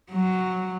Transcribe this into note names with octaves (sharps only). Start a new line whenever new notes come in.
F#3